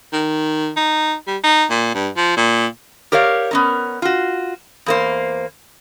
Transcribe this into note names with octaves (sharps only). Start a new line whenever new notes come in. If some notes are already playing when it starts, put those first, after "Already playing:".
D#3
D#4
G3
D#4
A#2
G2
F3
A#2
G4 A#4 C#5 D5 F5
B3 C#4 A#4
F4 F#4
E2 A#3 C5